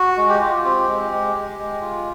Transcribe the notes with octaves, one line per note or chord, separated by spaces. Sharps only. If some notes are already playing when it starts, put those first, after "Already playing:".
Already playing: F#4
G#3
G4
F4
C4 G4
G#3
G#3
G#3
G#3
F4